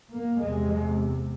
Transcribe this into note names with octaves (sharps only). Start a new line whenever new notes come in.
A#3
E2 C3 G#3